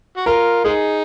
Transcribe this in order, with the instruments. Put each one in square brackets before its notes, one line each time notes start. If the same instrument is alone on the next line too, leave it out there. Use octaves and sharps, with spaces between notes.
[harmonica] F#4
[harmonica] F4 [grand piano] A#4
[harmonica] G#3 D#4 [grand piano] G#4